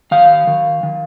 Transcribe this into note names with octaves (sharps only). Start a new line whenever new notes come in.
D#3 F5
D#3
D#3